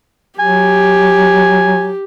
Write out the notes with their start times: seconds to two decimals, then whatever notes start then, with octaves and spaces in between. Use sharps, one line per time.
0.40 F#3 G4 G#5